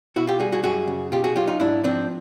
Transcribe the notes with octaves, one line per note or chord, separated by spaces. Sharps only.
B2 E4 F#4
F4 G4
G3 F#4 G#4
F#4 G#4
F#2 F#4 G#4
C#3
B2 F4 G4
F#4 G#4
F#3 F4 G4
D#4 F4
G#2 D4 E4
F3 C4 D4